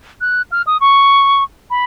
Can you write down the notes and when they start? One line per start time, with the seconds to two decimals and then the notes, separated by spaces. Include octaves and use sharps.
0.21 F#6
0.52 F6
0.67 D#6
0.81 C#6
1.70 B5